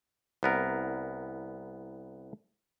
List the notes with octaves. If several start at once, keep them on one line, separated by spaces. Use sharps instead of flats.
C2 B3 A#4